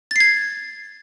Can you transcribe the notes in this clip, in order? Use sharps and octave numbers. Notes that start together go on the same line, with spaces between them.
G#6 A6 C7